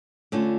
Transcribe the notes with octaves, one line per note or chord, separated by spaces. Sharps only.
D3 A3 C#4 F4